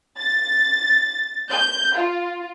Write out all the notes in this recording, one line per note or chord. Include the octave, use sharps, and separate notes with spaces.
A6
G6
F4